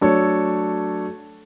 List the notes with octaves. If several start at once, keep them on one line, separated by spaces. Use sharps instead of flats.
F#3 A3 D4 A4 C#5